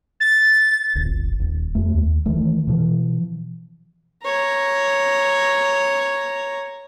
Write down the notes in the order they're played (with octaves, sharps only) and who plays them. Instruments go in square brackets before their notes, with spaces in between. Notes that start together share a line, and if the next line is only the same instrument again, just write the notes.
[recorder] A6
[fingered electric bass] D1 G1
D#1
F2 A3
D#2
D#3 E3 A3
B2 E3 F3
[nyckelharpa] C#5 A#5